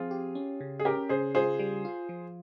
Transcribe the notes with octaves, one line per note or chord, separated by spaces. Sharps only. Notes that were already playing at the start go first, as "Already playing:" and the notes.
Already playing: F3 C4 F4 G#4
G4
C#4
C#3
G#4
C#4 G4 A#4
C#3 G#4 C5
F4 G#4 C5
G3
F4
F3